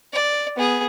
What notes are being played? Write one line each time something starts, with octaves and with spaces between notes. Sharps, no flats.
D5
B3 G#4